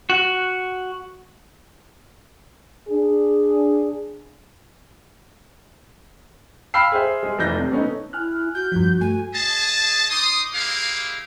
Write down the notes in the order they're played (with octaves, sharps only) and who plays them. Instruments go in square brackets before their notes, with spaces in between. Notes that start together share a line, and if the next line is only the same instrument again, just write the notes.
[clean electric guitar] F#4
[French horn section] D4 G#4
[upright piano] F5 G5 B5 E6 F6 C7
G#4 C5 E5
G#3 G#4
F1 E3 F#6 G6 A#6
C3
A3 B3 C#4 D#4
[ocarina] E4 [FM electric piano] G#5 F6 F#6
[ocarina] F#4 [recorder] G6
[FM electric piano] G2 F3
[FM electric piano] A3 [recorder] G#5
[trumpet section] G#4 D#5 A5
D#4 C6 D6 D#6
G#3 A#3 E4 G4 F5